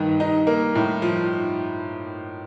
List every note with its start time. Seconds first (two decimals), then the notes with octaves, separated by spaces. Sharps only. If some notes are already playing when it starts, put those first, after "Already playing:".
Already playing: G2 D#3
0.20 D#4
0.47 A#3
0.75 A2
1.02 F3